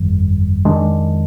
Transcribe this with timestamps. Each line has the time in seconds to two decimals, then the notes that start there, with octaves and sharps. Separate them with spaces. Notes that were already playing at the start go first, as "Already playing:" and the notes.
Already playing: G1 F2 D#3 G3
0.65 F2 D#3 G#3 D4